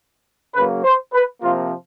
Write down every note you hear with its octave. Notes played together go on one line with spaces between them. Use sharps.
C#3 F#3 A#3 B4
C5
B4
C3 F3 A#3 F4